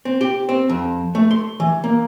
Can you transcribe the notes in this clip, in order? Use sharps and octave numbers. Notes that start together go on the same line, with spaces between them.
C4
G4
C4
F2
A3
C6
E3
A#3